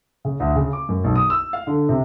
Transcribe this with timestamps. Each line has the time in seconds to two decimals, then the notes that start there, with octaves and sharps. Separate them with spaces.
0.25 C#3
0.40 D2
0.55 C#3
0.73 D6
0.89 F#2
1.04 B1
1.16 D#6
1.30 E6
1.53 F5
1.67 D3
1.89 C3